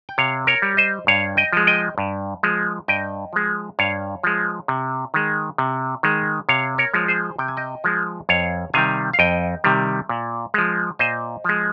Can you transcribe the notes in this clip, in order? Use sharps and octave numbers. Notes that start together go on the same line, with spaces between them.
G5
C3 C#5 F5
A#4 C#5
G3
C5 D#5
G2 C#5 F5
D#5 G5
F3 G#3
D#5 G5
G2
F3 G#3
G2 D#5 G5
F3 G#3
G2 C#5 F5
F3 G#3
C3
D#3 G#3
C3
D#3 G#3
C3 C#5 F5
A#4 C#5
F3 G#3
G#4 C5
C3 G5
G#5
D#5 G5
F3 G#3
F2 C#5 F5
C3 D#3 G3 F5 G#5
F5
F2 D#5 G5
C3 D#3 G3
A#2
F3 G#3
A#2 C5 D#5
F3 G#3